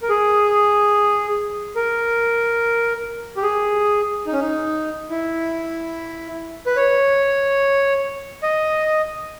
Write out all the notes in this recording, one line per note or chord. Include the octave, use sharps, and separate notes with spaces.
A#4
G#4
A#4
G4
G#4
D#4
C#4
D#4
E4
B4
C#5
D#5